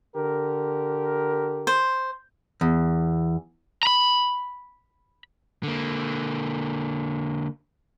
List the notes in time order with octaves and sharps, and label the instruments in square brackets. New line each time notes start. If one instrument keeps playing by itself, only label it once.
[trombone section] D3 G4 A#4
[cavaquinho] C5
[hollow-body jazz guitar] E2
[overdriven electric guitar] A#5 B5
D3 A#3